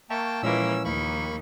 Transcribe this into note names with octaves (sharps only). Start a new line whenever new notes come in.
A#3 E5 G5 A5 A#5 C#6
A#2 E3 F3 G#3 A#3 C#4 A#4 E6
D#2 F3 A#3 B5 C#6